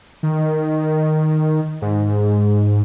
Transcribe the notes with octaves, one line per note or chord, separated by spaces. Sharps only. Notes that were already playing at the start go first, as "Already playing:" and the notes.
D#3
G#2